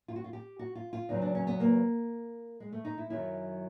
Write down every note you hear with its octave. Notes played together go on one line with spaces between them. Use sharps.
F4
F#4
F4
G4
F#4
F4
F4
E2 C#3 F#3 D#4
D4
C#4
B3
A#3
G#3
A3
D#4
E4
F#2 D#3 F#3 E4